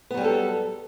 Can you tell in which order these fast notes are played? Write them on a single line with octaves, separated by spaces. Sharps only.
B3 F#3 G3 G#4 A4